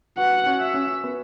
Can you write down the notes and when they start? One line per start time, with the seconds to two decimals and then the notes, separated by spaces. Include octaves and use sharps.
0.17 F#4 B4 F#5
0.46 C#4 F#4
0.60 E5
0.74 C#4
1.04 B3